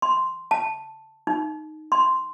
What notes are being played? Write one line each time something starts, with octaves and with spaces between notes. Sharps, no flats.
C6
A5
D#4
C6